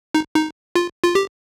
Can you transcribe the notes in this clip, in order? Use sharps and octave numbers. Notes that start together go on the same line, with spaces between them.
D#4
D#4
F4
F4
G4